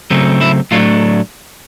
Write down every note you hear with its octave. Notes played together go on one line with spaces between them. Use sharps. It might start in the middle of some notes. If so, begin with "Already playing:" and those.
C#3 F#3 A3 C4
E4
A2 F#3 A3 D4 F4